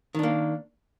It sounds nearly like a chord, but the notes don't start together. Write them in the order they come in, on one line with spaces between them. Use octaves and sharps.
D#3 D4 A#3